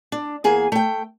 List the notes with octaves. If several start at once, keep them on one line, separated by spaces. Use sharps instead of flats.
D4
E2 A#3 G#4 G#5
A3 G5